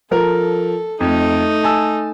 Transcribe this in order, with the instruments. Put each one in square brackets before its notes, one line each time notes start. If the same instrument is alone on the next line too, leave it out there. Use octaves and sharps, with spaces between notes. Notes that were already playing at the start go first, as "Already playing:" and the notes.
[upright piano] F3 A#4 [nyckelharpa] A4
[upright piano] F2 [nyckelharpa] A3 D#4
[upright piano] G#5 A5 E6